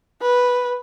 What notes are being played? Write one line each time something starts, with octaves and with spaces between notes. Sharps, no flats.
B4